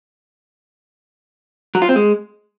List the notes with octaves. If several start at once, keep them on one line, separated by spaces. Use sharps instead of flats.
F#3
F4
C4
G#3